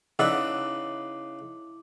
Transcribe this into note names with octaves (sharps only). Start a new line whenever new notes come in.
C#3 D#4 E4 B4 D5 E5 F#5 D6